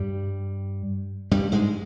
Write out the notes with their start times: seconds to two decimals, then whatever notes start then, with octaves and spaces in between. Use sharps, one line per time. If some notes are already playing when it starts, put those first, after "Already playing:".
Already playing: G2 G3
1.31 G2 G3
1.52 G#2 G#3